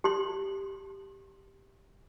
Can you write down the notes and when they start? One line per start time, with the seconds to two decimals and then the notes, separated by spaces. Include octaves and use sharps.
0.04 G4 C6